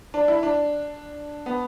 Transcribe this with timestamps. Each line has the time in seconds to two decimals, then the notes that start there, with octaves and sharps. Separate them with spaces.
0.14 D4
0.28 E4
0.43 D4
1.46 B3